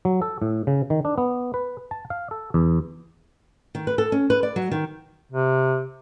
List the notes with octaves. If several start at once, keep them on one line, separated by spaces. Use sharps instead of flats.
F#3
A4
A2
C#3
D#3
D4
B3
B4
A5
F5
A4
E2
D#3
B4
A4
C#4
B4
D5
F#3
D#3
C3